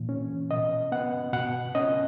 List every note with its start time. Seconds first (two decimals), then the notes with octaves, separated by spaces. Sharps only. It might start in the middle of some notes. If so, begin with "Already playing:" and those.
Already playing: A#2 E3
0.09 C#4
0.51 B2 D#5
0.92 B3 F#5
1.33 B2 F#5
1.75 C#4 D#5